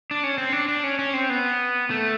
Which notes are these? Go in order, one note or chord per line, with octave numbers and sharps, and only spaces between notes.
D4
C#4
C4
D4
D4
C#4
C#4
C4
B3
A3